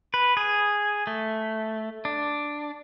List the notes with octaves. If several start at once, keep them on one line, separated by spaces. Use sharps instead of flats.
B4
G#4
A3
D4